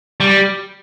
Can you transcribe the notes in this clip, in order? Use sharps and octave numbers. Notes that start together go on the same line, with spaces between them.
G3